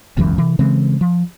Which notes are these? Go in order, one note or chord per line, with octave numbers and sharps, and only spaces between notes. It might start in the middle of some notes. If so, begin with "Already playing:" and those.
E1 C#2 F#2 E3
C3 E3
C#3 E3 G#3 C4
F3